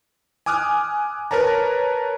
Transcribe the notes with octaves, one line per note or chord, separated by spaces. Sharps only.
G#5 D6 D#6 F6 F#6
A#4 B4 C#5 A5 A#5